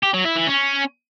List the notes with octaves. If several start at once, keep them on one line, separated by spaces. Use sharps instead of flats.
G4
F#3
E4
E3
C#4